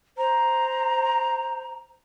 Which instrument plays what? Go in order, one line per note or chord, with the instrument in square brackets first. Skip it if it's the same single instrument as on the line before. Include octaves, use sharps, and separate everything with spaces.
[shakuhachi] C5 [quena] A#5